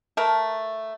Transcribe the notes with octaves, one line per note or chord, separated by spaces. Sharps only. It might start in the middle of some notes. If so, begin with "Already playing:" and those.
A3 A#4